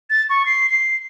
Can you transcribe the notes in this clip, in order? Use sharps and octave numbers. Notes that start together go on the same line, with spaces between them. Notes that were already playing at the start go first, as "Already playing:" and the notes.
A6
C#6
C7
C7